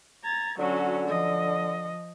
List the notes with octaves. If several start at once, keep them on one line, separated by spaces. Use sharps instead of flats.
A#5 G#6 A6
D3 F#3 C#4 F#4
F3 D#5